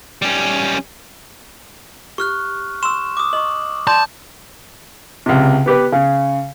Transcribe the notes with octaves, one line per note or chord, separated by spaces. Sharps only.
G3 C#4
G4 C#6 F6 F#6
C6 C#6 E6 E7
D6 D#6
D#5 C#6 F#7
D5 A5 C6 G6
C#2 C3
B3 G4 B4
C#3